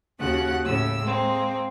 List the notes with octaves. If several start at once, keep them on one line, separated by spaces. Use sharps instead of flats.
D#2 C#3 A#3 F#4 F#5 F#6
A2 C#3 E6
G#3 A#3 C4